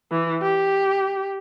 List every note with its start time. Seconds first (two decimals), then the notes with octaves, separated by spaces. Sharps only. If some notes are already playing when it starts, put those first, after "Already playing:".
0.11 E3
0.42 G4